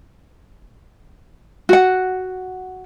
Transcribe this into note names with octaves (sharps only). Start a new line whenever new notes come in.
F#4 F#5